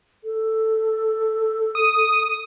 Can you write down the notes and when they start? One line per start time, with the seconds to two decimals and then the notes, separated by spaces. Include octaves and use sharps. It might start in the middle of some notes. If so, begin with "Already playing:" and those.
0.24 A4
1.75 D#6